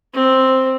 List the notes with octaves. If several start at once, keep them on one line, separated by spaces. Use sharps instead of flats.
C4